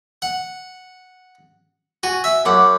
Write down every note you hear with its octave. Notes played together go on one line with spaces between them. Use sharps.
F#5
F#4 G#5
E5
F#2 F#5 D6